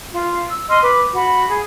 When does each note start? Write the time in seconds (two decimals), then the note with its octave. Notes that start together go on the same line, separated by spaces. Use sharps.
0.13 F4 F5
0.50 E6
0.68 D#5 C6 F6
0.82 B4 D6
1.13 F#4 B5
1.48 G#4